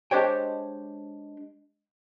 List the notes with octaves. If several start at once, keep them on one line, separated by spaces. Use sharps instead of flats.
G#3 D4 G4 C5 C#5 G5